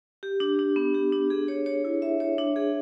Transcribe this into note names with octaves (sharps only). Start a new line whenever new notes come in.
G4
D4
D4
B3
G4
D4
G#4
C#5
C#5
E4
E5
C#5
D4
G#4